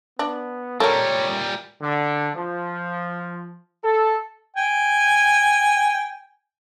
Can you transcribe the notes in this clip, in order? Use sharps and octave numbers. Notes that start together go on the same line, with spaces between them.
B3 D4
A#2 G3 A4 A#4 C#5
D3
F3
A4
G5 G#5